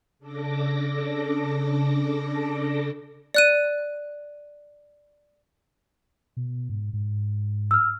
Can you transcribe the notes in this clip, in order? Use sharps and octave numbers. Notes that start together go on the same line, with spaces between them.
C#3 D4 A4 D6 A#6
D5 F#6 D#7
B2
G#2
G#2
E6 F6